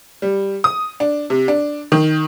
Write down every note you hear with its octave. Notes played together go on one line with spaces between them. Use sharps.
G3
D#6
D4
C3
D4
D#3